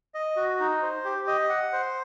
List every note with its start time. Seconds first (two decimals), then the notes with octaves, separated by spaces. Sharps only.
0.15 D#5
0.37 F#4
0.60 D#4
0.82 C5
1.05 G4
1.27 D#5
1.50 F#5
1.73 C5